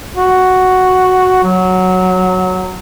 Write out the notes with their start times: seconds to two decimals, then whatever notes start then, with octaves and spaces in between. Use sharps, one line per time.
0.15 F#4
1.43 F#3